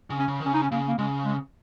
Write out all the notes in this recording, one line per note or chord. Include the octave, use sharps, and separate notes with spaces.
C#3
C#4
C#3
D#3
C#3 C#4
D#4
C#4
C#3 A#3
A#3
C#3 G#3
G#3